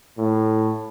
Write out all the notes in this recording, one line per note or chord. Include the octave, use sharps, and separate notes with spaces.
A2